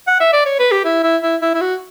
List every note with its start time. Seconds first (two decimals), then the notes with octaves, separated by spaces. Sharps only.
0.08 F#5
0.20 E5
0.33 D5
0.46 C#5
0.59 B4
0.72 G4
0.85 E4
1.03 E4
1.23 E4
1.42 E4
1.54 E4
1.61 F#4